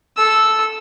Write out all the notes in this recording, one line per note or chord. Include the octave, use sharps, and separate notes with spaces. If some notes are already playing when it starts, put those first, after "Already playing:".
A4 E6